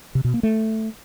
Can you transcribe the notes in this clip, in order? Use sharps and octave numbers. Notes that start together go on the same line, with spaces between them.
C3
B2
A#3
A3